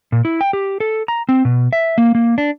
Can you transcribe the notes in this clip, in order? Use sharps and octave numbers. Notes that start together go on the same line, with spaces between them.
A#2
E4
G5
G4
A4
A#5
C4
B2
E5
A#3
A#3
D4